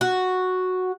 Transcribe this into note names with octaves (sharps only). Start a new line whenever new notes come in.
F#4